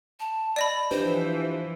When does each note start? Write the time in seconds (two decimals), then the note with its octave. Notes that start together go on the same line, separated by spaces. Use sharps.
0.19 A5
0.56 D5 D#5 B5
0.91 E3 F3 D4 G4 B4 C5